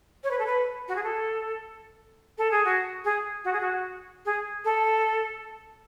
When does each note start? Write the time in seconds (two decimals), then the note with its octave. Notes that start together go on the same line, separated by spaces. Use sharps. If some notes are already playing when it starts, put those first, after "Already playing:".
0.23 C#5
0.31 B4
0.38 A4
0.46 B4
0.88 F#4
0.95 G#4
1.03 A4
2.38 A4
2.51 G#4
2.64 F#4
3.04 G#4
3.44 F#4
3.53 G#4
3.60 F#4
4.25 G#4
4.64 A4